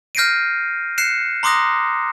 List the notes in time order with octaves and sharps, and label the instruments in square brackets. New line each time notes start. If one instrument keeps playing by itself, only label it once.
[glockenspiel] F6 G6 A#6 C7 D7 D#7
F#6 C7 C#7 E7
A#5 C6 D6 D#6 F#6 A#6